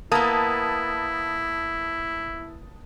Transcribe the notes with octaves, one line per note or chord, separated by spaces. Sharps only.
A#3 B3 E4 A5 D#6